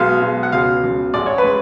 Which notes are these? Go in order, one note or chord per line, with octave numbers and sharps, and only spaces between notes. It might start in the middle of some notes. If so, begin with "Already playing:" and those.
Already playing: B1 B2 G#3 F5
B1 B2 G#3
F#5
C#2 B2 G#3 F5
C#2 B2 G#3
A1 G#2 G#3 D5
C#5
B4
G#3